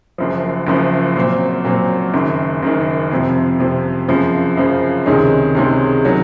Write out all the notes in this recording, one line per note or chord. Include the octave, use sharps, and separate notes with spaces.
F#1 F#2 F3
F#1 F#2 F3
A#2 F#3 C4
A#2 F#3 C4
F#1 F#2 D#3
F#1 F#2 D#3
F2 C3 F3
F2 C3 F3
F#2 C#3 F3 C4
F#2 C#3 F3 C4
C#2 C3 D#3 G#3 C#4
C#2 C3 D#3 G#3 C#4
D#3 F#3 C#4